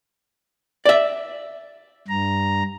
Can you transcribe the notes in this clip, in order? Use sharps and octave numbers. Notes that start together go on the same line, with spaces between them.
D5 E5
G2 A#5